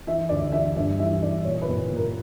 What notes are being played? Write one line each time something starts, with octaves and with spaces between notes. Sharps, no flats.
E3 E5
D2 D5
E3 E5
G2 E5
E3 E5
E3 D5
A#2 C#5
B4
A#2
A#2
A#4